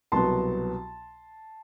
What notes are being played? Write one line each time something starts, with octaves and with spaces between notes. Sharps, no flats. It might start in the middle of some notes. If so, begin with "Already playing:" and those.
C2 B2 F#3 B3 A5 C6